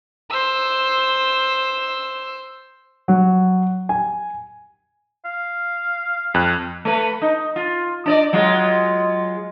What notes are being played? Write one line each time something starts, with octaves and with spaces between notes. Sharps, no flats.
C5 E6
F#3
G#5
F5
F2 F#6
A3 B4
D#4
F4
D4 D5 D#5
F#3 G#3 F4